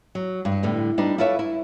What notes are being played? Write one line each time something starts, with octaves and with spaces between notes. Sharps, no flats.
F#3
G2
A2 D3 G3 B3
G3 D4 D#4 B4
E4 F4 A4 B4 C#5 E5
E4